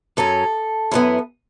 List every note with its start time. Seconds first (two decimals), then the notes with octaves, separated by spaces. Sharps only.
0.17 F#2 F#3 C#4 A4
0.91 F#2 E3 B3 E4